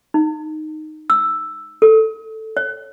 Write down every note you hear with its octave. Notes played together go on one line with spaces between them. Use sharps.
D#4
E6
A4
C#5